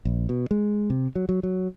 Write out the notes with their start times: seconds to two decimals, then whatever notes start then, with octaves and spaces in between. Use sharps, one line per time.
0.05 A#1
0.29 B2
0.51 G#3
0.90 C3
1.16 F#3
1.29 F#3
1.43 F#3